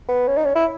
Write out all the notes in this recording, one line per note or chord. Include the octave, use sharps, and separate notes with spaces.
B3
C#4
D#4
C#4
E4